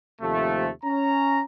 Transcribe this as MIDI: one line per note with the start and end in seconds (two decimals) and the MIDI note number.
0.21 0.69 39
0.21 0.69 48
0.21 0.69 53
0.21 0.69 57
0.84 1.42 61
0.84 1.42 82